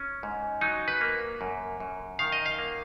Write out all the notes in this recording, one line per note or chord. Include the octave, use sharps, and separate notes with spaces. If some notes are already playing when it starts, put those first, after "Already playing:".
Already playing: C#4
G#2
F#3 D#4
B4
A#3
F#2
F#2
D#3 F5
D#5
F5
A#3